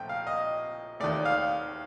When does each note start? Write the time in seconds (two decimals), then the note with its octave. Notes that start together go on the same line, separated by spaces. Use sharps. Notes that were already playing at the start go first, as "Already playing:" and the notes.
Already playing: A#1 A#2 F3 A3 C4 G5
0.09 F5
0.27 D#5
1.00 D#2 D#3 A3 D5
1.25 F5